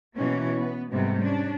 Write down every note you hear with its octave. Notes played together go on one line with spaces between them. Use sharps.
B2 E3 A#3 C#4
B3
G#2 C3 G3 A3 B3
C#4 D4